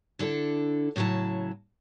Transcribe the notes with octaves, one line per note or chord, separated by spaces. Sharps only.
D3 D4 E4 A4
A2 C#3 F#3 E4 A5